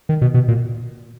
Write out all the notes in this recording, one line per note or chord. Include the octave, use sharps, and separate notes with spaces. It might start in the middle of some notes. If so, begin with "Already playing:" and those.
D#3
B2
B2
A#2